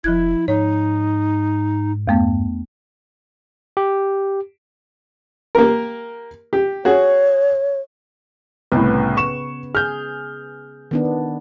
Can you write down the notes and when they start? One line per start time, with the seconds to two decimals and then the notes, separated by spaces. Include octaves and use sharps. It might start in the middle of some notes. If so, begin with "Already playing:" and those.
0.04 F1 F3 E4 F#6 G#6
0.48 G#2 D#4 C#5
2.07 E2 G2 A3 B3
3.77 G4
5.55 A#3 G4 A#4
6.53 G4
6.85 F#4 G#4 C#5
8.72 C2 A2 C#3 B3 B4
9.17 C#6 E7
9.75 G#4 F6 G6
10.91 D#3 B3 D4